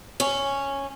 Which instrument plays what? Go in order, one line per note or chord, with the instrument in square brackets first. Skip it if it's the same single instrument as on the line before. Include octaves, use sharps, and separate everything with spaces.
[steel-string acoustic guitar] C#4